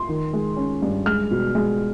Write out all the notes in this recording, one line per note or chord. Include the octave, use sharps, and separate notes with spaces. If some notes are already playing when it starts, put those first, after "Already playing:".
Already playing: C6
D#3
G#3
C#4
G2
G#3 F6
B2
G#3